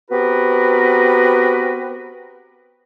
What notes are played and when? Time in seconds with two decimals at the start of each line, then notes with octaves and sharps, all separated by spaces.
0.11 B3 C4 F#4 G4 A#4 B4